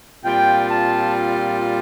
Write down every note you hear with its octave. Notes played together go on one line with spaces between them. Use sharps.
A#2 G3 C4 F4 G5
A5